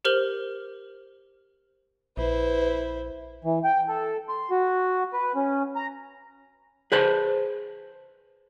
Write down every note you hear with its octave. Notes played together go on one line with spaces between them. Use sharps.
G4 A#4 C5 F6 F#7 G7
A#1 E4 B4 C5
E3
G5
A4
C6
F#4
B4
C#4
A#5
G#4 B4 C5 A5